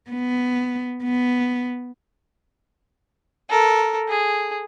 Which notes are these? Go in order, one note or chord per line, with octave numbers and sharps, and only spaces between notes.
B3
B3
A4 A#4
G#4